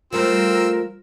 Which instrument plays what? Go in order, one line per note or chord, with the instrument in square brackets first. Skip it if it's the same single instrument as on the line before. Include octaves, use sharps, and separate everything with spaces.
[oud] F3 G3 A3 [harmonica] C4 E6 [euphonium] F4 [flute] A#4